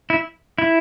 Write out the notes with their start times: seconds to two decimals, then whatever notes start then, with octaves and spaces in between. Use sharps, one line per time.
0.10 E4
0.58 E4